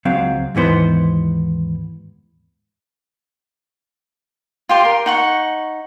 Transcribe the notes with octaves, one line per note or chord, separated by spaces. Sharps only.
C#2 F#3 C4 F5
D#2 G#2 E3 B3 C5
F4 G4 C6
A#4
D#4 F#5 C#6